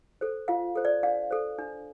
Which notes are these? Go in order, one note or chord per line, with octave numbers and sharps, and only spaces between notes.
A4 C5
F4 F5
A4 C5
D5
D4 F5
A4 C5
D4